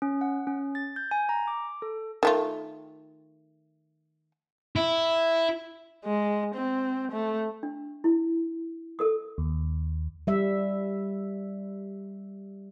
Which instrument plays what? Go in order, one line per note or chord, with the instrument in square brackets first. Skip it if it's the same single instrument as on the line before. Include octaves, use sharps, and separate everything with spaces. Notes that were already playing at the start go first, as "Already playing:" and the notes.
[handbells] C#4
F#5
C#4
A6
G6
G#5
A#5
D6
A4
[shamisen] D#3 A3 F4
[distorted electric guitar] E4
[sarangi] G#3
C4
A3
[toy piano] D4
E4
A4 A#4 D#6
[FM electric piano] D#2
[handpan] G3 E5